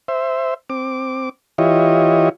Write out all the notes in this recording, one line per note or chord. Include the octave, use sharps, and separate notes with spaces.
C5 E5
C4 D6
E3 E4 F4 G4 C#5 D#5